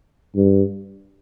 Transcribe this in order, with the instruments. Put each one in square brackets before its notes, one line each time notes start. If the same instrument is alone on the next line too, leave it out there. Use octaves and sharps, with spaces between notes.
[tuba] G2